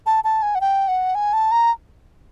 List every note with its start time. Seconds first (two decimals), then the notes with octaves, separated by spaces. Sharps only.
0.06 A5
0.24 A5
0.42 G#5
0.55 F#5
0.61 G5
0.88 F#5
1.15 G#5
1.33 A5
1.52 A#5